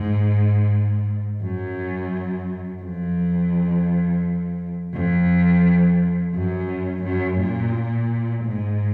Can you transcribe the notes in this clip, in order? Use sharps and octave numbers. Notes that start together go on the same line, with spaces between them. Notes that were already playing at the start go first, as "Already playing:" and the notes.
Already playing: G#2
F#2
F2
F2
F#2
F#2
A#2
G#2